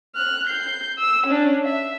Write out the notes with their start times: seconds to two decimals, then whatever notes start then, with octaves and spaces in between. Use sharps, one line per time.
0.15 F6 F#6
0.47 G6 C7
0.98 E6
1.27 C#4 D4
1.64 E5